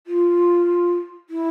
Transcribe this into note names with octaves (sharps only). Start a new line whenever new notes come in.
F4
E4